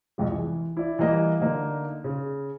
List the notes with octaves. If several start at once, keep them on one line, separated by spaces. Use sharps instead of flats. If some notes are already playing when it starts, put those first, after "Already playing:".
C2 F2 G#3
E3
E4 D5
E3 G3 A#3 D#5
D3 A#3 D#4
C#3